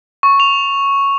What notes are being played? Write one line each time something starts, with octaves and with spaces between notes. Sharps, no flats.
C#6
F7